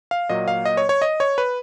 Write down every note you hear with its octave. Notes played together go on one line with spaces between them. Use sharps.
F5
A#2 F#3 A#3 D#5
F5
D#5
C#5
C#5
D#5
C#5
B4